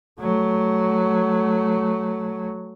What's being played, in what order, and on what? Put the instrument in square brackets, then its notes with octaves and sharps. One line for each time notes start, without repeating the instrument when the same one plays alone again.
[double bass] F#3 A3